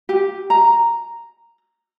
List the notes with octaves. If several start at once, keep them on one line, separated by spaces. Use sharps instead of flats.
G4
A#5